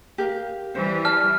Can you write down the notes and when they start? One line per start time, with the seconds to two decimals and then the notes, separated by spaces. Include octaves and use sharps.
0.18 G4 A#4 F5
0.75 E3 G3 C5
1.05 D5 A5 F6